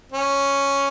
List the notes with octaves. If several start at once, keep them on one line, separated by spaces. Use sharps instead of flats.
C#4